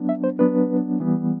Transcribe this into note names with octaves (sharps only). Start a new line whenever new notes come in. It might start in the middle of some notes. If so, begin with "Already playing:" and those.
Already playing: F#3 B3 D4
E5
C5
F#3 B3 D4 B4
E3 G3 B3